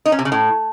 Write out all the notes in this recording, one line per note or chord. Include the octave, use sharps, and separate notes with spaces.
D#4
C#4
C3
C#3
A2